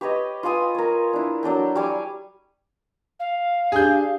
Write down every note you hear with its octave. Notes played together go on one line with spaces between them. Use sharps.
G4 B4 C#5 D#5
F4 B4 G#5 D#6
A#4 C#5
D4 E4
F#3 D4 A4 G5
G3 C#5 G#5 D6
F5
D4 G4 G#4 G6